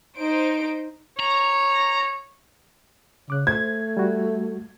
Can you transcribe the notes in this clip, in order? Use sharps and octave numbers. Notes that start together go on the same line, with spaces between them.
D#4 C5 D7
C#5 A#5
C#3 D6 F#6
A3 C5 G#6
G3 F#4